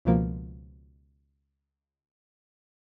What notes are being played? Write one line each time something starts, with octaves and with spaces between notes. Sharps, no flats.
C#2 B2 F3 A#3